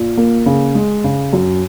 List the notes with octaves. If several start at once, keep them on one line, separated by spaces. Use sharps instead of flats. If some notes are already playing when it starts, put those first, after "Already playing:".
Already playing: A#2
A#3
C#3
G#3
C#3
F#2